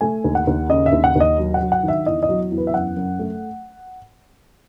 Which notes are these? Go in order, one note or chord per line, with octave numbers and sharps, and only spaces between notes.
A3 G#5
D#2
F#5
D#2
C#3 D#5
E5
D#2
F#5
D#2 D#5
F#3
F#5
F#3
F#5
D#3
E5
E2 D#5
D#5
F#3
E2
B4
E5
F#2 F#5
F#2
A3